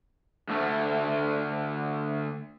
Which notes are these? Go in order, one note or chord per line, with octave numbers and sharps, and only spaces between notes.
D2 A3